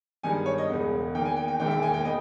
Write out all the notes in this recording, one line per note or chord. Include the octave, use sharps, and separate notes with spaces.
G2 D#3 G#3 B3 G#5
C#5
D#5
E1 E2 C#3 G#3 B3
E2 D#3 A#3 G5
G#5
G5
G5
E1 D#2 D#3 G#3 G5
E5
G5
G#5
G5
B3 D#5